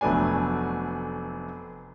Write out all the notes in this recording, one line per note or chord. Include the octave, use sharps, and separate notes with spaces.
F1 F#3 A3 B3 D4 G#5